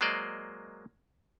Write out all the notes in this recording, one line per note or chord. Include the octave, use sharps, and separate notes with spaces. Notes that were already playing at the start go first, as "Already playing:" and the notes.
F#3 G#3 A#3 C5 D5 D#5